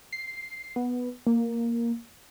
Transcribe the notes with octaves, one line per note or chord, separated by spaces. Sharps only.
C7
B3
A#3